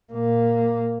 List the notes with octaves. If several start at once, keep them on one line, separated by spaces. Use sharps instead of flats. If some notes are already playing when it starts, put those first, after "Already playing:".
A#2 A#3